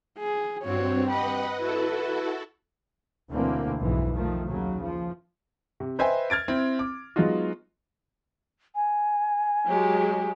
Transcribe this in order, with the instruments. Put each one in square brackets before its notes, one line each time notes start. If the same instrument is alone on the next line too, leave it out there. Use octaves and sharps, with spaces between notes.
[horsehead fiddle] G#4
[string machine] G2 C4 [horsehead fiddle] F#4 C#5
[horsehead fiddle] G4 B5 [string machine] B4 D#5 F#5
[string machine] E4 F#4 A4 [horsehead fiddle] B4
[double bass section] D2 B2 D3 E3 A#3 C4
B1 F2 G#2 E3 G#3
D#3 F3 A3
D#2 C#3 F#3
F3
[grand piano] C3
B4 C5 D#5 E5 G5 G#5
F6 G#6 A6 D7
C4 E4
D6
F#3 G#3 B3 D#4 F4 F#4
[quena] G#5
[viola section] F#3 G#3 G4